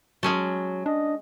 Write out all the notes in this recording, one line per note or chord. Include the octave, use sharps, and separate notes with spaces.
F#3 G#3 C#4 A5
D4 D#5